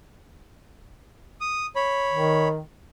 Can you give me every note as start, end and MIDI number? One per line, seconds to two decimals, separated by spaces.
1.41 1.66 87
1.76 2.48 73
1.76 2.48 83
2.12 2.60 51